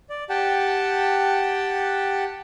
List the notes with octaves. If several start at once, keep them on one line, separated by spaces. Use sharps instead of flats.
D5
G4 F#5 G5 A5